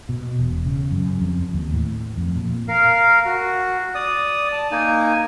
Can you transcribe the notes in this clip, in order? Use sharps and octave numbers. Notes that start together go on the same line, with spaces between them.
B2
E1
C#3
F#2
F2
D#2
A2
F2
A#2
A#4 F5
F#4
D5 D#6
A5
A#3 D#4 G#5